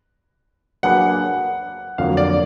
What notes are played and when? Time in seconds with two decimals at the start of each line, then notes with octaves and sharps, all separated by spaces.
0.83 F#3 A#3 D4 G#4 B4 F#5
1.98 F2 D3 F#3 A#3 F5
2.17 D5